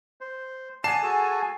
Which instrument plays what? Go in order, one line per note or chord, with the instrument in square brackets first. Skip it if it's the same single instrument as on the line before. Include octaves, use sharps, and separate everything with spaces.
[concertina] C5
[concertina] D5 F#5 [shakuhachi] G#5 [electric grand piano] A5 C7 E7
[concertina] F#4 G#4 A4